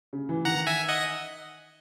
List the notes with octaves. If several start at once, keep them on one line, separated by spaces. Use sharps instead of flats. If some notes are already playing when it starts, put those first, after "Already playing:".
C#3
E3
D#3 F#5 A#5
E5 G#5
D#5 F#5